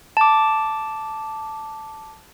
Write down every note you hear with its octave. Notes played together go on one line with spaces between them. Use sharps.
A5 D6